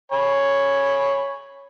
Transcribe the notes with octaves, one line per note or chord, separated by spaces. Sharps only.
C#5 G#5 B5